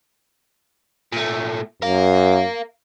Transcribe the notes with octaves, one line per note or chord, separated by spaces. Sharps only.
A#2 A3
F#2 A#4 F5